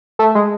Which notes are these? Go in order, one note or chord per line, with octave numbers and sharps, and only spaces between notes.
A3
G#3